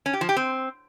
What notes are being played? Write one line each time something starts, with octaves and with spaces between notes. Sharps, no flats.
C#4
G4
F3
G4
C4